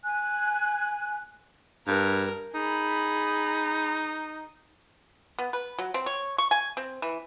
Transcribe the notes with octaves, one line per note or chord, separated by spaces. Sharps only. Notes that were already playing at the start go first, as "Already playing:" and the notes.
G#5 F#6
G2 A#4
D#4 G#4 B5
B3
B4
F#3
C4
C#5
C#6
G#5
C4
E3